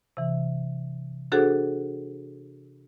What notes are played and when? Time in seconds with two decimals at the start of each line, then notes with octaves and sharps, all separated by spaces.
0.17 C3 E3
1.32 D4 F#4 G#4 A4 C5 F#5